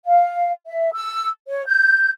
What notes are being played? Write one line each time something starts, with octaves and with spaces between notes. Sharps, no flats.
F5
E5
E6
C#5
G6